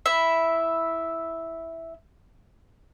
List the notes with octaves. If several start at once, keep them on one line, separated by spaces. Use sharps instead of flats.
E4 E5